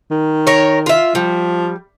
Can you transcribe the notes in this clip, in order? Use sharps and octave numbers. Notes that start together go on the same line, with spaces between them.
D#3
A#4 C#5
F4 E5
F3 G3